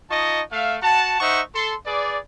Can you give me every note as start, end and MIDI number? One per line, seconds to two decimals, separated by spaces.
0.11 0.42 63
0.11 0.42 65
0.11 0.42 75
0.11 0.42 81
0.11 0.42 85
0.51 0.77 57
0.51 0.77 76
0.51 0.77 77
0.82 1.20 66
0.82 1.20 78
0.82 1.20 81
1.21 1.41 63
1.21 1.41 72
1.21 1.41 76
1.21 1.41 78
1.21 1.41 85
1.55 1.75 69
1.55 1.75 84
1.86 2.18 68
1.86 2.18 71
1.86 2.18 74